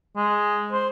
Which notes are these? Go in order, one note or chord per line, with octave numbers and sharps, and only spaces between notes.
G#3
C5